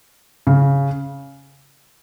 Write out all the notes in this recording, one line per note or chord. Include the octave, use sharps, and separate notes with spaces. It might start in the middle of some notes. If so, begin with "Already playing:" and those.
C#3